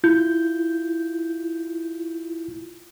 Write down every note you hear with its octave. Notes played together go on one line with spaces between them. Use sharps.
E4 F4 G6